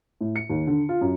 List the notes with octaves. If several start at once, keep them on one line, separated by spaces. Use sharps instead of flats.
A2
C#7
D#2
D3
F4
F#2